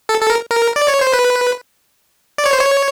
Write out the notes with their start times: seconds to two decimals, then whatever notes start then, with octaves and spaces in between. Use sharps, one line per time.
0.09 A4
0.21 A4
0.30 A#4
0.51 A#4
0.76 D5
0.88 C#5
1.01 C5
1.13 B4
2.38 D5
2.46 C#5
2.53 C5
2.60 C#5